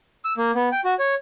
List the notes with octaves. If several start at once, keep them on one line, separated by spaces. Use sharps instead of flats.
E6
A#3
B3
G5
F#4
C#5